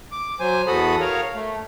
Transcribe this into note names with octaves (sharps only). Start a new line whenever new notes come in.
D6
F#3 C5 G#5
E2 F#4 A4 B5 D#6
A#4 C#5 F5
A3